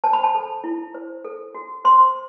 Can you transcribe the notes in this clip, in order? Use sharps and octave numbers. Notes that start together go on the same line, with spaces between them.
C5 A5
B5
A5
A4
E4
C5
A4
F#4
C5 C6